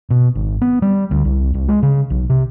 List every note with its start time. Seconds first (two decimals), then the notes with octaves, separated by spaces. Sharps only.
0.10 B2
0.35 G#1
0.62 B3
0.82 G3
1.11 D2
1.25 C2
1.54 C2
1.68 G#3
1.83 C#3
2.10 B1
2.30 C3